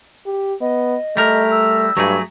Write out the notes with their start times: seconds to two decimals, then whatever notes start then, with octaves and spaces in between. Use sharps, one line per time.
0.26 G4
0.61 B3 D#5
1.17 G3 A3 A#4
1.51 E6
1.97 G2 F#3 A3 G#4